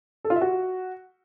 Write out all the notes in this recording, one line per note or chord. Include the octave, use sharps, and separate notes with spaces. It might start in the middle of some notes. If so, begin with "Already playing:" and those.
A4
F4
E5
F#4